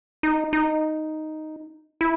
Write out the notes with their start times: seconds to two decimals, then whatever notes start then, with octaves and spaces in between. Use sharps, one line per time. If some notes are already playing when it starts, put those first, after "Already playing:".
0.23 D#4
0.53 D#4
2.01 E4